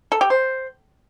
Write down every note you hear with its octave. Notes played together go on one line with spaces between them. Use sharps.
A4
G4
C5